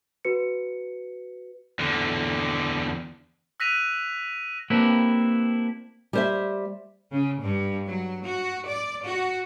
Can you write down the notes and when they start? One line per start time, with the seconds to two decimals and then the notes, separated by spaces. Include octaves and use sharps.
0.25 F#4 B4 C#7
1.79 E2 D3
3.60 E6 F#6 A#6 B6 D#7 F7
4.70 A#3 C4 D4 E4 G4 B4
6.13 G3 C5 E5
7.11 C#3
7.41 G2
7.88 F#3
8.24 F#4
8.68 D5
9.04 F#4